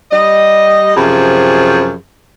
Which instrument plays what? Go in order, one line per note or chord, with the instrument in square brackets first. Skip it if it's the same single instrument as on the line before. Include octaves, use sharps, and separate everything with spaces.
[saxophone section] G3 D#5
F#2 C3 F3 G4 G#4